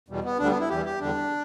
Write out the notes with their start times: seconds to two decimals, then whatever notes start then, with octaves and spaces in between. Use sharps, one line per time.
0.08 E2 B2 G3
0.24 B3
0.39 D2 D3 G3 D4
0.49 B3
0.60 E4
0.70 E2 E3 G3 G4
0.86 G4
1.00 E2 D3 G3 D4